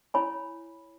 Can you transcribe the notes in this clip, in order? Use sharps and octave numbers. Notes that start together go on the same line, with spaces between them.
E4 C#5 G#5 B5